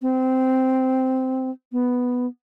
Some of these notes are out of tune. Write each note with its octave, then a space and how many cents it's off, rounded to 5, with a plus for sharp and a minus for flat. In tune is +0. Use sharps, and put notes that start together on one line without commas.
C4 -10
B3 +0